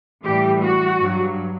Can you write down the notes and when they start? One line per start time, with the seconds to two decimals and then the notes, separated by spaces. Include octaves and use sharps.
0.24 A2 E3 G3 G4
0.62 F#4
1.01 G2 F#3